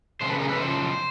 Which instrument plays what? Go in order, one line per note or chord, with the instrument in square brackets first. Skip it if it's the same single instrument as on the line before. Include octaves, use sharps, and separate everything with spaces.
[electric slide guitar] F#2 C#3 C5
A4 B4
G#4 A#4
A4 B4
F#2 C#3 F3 C5